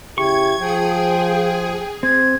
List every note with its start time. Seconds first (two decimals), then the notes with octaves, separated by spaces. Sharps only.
0.18 C#3 E4 G4 C#6 G#6
0.60 F3 G#4 G5
2.03 C4 G#6